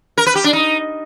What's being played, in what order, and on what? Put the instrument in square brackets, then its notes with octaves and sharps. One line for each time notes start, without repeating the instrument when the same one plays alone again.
[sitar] A#4
B4
G4
D4
D#4